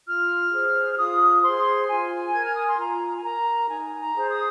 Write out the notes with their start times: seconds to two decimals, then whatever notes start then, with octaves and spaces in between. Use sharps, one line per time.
0.07 F4 F6
0.53 G#4 C5
0.91 F6
0.98 F4 D#6
1.43 G#4 C5 C6
1.89 F4 G#5
2.33 A#4 G#6
2.44 F6
2.55 D#6
2.68 C6
2.79 F4 A#5
3.15 G#5
3.24 A#4 A#5
3.69 D#4 G#5
4.00 A#5
4.15 G#4 C5
4.30 D#6